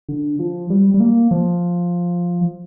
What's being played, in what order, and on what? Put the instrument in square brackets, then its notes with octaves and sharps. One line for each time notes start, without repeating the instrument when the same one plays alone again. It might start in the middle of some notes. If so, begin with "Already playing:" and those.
[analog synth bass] D3
F3
G3
G3
A#3
F3